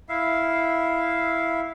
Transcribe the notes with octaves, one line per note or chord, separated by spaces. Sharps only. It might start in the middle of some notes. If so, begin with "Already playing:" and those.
E4 E5 F5